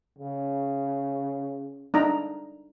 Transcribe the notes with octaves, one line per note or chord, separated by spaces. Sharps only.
C#3
D4 D#4 A#5